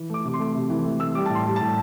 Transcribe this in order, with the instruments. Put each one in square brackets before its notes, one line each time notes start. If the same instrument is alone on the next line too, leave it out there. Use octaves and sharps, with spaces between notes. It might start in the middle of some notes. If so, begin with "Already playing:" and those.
Already playing: [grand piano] E3
A3 D6
C3 D6
C6
A3
C3
E3
A3
A3 E6
G3 D6
A2 A5
C6
G3
A5
A2